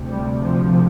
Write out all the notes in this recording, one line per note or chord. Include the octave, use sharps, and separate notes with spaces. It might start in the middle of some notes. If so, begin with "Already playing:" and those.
Already playing: D2 C3
G3
F3